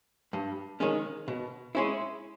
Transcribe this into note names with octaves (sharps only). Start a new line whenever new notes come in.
G2
D#3 G#3 C#4
B2
G#3 C#4 E4